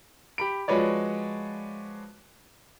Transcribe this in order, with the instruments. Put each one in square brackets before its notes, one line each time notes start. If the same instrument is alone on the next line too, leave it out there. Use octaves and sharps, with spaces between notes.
[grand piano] G4 B5 D7
F3 G#3 F#4 B4 C#5 D5